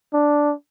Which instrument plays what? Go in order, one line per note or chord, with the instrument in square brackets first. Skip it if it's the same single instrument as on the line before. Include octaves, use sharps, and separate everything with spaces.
[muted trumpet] D4